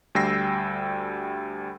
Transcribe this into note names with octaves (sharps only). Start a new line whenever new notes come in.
D2 G3 G5 E6 A#6 C7